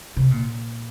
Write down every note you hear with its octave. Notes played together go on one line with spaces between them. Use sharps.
C3
A#2